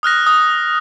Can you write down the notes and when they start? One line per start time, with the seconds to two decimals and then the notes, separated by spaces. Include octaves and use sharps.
0.03 D#6 F6 F#6 A#6
0.27 D#6